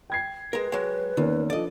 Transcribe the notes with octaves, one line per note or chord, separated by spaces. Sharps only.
G5 G#6 C7
G#3 A#4 B4
F#3 G#3
E2 D#3 A#3 C#4
F3 D4 A4 D5 D#5